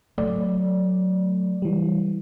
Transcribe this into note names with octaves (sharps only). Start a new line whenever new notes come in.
F#3 A3 D5
E3 G3